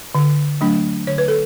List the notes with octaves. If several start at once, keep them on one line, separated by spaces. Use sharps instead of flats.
D3
F#3 A3 D4
D3 C#5
B4
A4